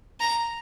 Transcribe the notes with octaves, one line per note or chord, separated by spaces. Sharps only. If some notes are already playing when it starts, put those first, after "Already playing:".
A#5